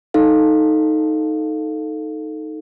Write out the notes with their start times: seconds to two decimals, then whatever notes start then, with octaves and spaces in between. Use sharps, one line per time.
0.14 D#4 A4 F5